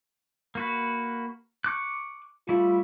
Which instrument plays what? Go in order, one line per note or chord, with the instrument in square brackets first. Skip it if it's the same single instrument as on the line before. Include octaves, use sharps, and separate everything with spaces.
[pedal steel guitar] A#3 F#4 B4
C#6 D6 F#6
[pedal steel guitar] G3 A3 E4 [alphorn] F4